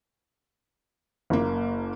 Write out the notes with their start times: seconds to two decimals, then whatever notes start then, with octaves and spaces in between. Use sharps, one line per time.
1.30 F#1 A#3